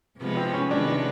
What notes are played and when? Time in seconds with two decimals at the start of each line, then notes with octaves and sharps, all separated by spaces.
0.19 C3 F3 G#3 B3
0.37 C4
0.54 C#4
0.71 C3 D#3 G#3 B3 D4
0.88 D4